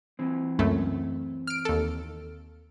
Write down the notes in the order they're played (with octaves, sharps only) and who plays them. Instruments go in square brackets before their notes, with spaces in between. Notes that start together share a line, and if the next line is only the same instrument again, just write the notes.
[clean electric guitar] E3 C4
[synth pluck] C#2 F#2 A3
F6 D7
D#2 A4